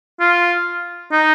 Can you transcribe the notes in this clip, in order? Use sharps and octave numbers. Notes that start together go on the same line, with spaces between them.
F4
D#4